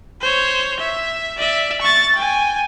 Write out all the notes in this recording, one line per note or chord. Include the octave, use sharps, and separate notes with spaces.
C5 C#5
E5
D5 E5
C#6 A6
G5 G#5